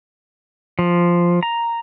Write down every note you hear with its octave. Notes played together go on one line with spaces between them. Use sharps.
F3
A#5